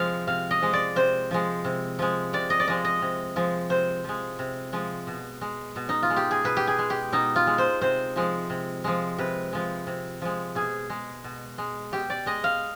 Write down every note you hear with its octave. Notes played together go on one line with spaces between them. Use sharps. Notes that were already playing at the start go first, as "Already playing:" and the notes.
Already playing: C3 F3 G#3 F5
C3 F5
D#5
F3 G#3
D5
C3 C5
F3 G#3
C3
F3 G#3
C3 D5
D#5
D5
F3 G#3 D#5
D#5
C3
F3 G#3
C3 C5
F3 G#3
C3
F3 G#3
B2
G#3
B2
D#4
F4
G#3
G4
G#4
B2 B4
G4
G#4
G#3
G4
B2 D#4
F4
G#3
C5
C3 C5
F3 G#3
C3
F3 G#3
C3 B4
F3 G#3
C3
F3 G#3
B2 G#4
G#3
B2
G#3
B2 G4
D5
G#3 D#5
F5